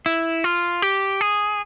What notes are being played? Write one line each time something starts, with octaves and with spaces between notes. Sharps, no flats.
E4
F4
G4
G#4